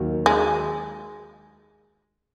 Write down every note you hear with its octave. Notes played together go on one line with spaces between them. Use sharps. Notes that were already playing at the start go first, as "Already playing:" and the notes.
Already playing: D#2 D#3 F#3
G#3